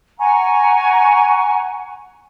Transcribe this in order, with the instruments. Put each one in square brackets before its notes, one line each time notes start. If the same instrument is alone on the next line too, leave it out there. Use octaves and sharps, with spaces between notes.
[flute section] F#5 G#5 A#5 C#6